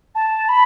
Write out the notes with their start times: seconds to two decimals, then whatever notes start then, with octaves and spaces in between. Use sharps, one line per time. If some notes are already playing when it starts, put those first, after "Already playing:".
0.15 A5
0.48 B5